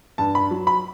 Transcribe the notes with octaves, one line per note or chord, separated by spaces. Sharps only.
G2 A5
B5
F#3
B5